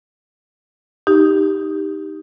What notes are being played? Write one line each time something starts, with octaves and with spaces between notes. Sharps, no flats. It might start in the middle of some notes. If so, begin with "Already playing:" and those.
D#4 G4